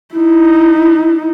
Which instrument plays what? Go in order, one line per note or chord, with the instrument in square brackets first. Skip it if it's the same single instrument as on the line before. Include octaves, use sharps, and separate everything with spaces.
[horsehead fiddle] D#4 E4